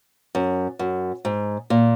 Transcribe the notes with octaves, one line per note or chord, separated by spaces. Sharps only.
F#2
F#2
G#2
A#2